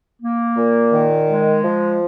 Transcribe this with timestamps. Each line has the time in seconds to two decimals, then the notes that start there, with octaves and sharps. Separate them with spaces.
0.21 A#3
0.57 A#2
0.92 D#3
1.28 G#3
1.64 F3